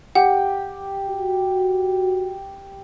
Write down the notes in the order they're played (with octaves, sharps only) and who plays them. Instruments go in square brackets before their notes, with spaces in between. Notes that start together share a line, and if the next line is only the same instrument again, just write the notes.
[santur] G4 [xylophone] F#5
[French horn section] F#4